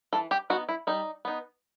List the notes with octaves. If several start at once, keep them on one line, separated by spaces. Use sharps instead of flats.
E3 A4
G4
B3 D#4 F#4
E4
G3 D#4
B3 D#4